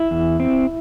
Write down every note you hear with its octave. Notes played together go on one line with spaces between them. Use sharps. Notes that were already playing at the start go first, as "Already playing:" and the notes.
Already playing: E4
E2
C4